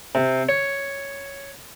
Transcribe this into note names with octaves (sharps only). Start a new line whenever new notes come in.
C3
C#5